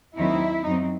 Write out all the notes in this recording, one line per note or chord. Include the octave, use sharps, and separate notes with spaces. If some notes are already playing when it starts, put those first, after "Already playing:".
D#2 D#3 F#3 C4 D#4 E4
F#2 F#3 C4 D#4